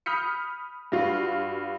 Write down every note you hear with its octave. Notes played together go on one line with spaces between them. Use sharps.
B5 D#6 F6 G6 B6 C#7
G2 F4 F#4